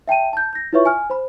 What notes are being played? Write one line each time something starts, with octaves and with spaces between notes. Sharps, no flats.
E5 G5 A5 D#7
A5 G6
G6 A#6
E4 F4 B4 C#5 E5 C#6
G#5 F6
C5 B5